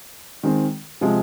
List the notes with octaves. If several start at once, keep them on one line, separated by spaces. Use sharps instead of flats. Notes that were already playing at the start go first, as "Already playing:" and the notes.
D#3 G#3 C4
C3 F3 G#3